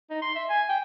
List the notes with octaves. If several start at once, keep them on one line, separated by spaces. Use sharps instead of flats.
D#4
C6
E5
G#5
G5